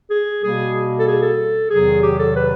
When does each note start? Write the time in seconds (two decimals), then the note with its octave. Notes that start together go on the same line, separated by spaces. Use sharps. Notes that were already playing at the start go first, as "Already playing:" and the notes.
0.10 G#4
0.42 B2 G3 A#3 G#4
0.98 A4
1.07 G#4
1.23 A4
1.71 E2 C3 D#3 F#3 G#4
2.03 G4
2.20 A4
2.36 B4